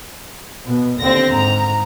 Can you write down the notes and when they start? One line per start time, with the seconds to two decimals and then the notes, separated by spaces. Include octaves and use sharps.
0.65 B2 B3
1.00 D#2 D3 C4 A#6
1.32 G#2 A#5